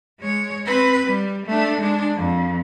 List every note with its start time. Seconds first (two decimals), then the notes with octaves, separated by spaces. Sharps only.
0.20 G#3 C#5
0.65 C4 B4
1.07 G3
1.46 A3 D4
1.80 G#3 D4
2.16 F2